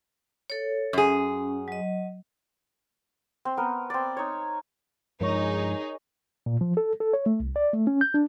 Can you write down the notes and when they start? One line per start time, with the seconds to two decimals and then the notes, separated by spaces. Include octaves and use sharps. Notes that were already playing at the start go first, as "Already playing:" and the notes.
0.50 A4 C#5
0.93 F#2 C#4 G#4
1.68 F#3 D#5
3.45 C4
3.57 B3 A#4
3.90 C4 D5
4.17 D#4 C#5
5.21 G2 F3 G#3 D#4 G#4 A#4 C#5 C#6
6.46 A#2
6.61 F3
6.77 A4
7.00 A4
7.13 C#5
7.26 A3
7.40 C2
7.56 D5
7.73 A3
7.87 C#4
8.01 G6
8.14 D4